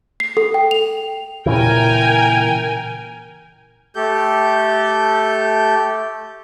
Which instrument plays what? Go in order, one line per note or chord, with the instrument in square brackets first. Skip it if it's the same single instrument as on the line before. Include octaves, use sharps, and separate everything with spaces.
[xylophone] C7
A4
G5
F7
[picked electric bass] A#2 C#3 E3 [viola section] A#4 G5 G#5
[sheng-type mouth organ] A3 G4 A4 G6